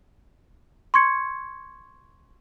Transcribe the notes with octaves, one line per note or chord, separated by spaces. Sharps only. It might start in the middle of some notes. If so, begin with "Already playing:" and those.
C6 C#6 G#6 C#7